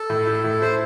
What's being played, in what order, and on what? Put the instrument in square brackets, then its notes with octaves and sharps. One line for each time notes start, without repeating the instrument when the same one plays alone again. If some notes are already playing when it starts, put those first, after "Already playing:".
Already playing: [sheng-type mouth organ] A4
[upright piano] A2
E4
A2
[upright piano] E4 [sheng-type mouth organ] C5